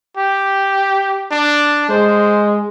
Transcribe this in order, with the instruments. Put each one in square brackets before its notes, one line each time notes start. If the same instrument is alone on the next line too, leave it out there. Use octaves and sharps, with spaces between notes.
[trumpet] G4
D4
[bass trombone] G#3 [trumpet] C5